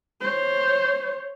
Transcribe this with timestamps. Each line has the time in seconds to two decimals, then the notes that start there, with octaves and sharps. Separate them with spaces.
0.21 C5 C#5